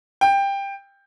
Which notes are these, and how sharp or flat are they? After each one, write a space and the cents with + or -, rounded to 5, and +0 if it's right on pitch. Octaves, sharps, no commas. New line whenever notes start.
G5 +15